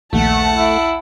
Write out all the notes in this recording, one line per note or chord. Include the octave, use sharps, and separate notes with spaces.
A#1 D#2 A3 F#5 A5
E4